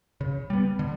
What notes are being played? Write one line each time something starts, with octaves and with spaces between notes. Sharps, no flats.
C#3
G3 B3
D3